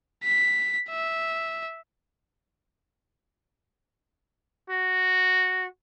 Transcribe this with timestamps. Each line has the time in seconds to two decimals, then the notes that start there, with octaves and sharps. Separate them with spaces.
0.24 B6
0.90 E5
4.70 F#4